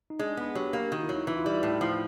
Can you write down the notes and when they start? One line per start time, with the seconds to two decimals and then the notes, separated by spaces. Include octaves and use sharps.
0.10 D#4
0.19 G#3 D4
0.37 B3
0.55 F#3 G4
0.73 A#3
0.92 D#3 F#4
1.03 E4
1.09 F#3
1.15 D#4
1.27 E3 E4
1.36 F4
1.45 G3 E4
1.63 A2
1.81 F3